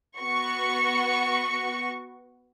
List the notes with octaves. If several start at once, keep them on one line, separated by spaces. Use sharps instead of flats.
B3 F#4 C#6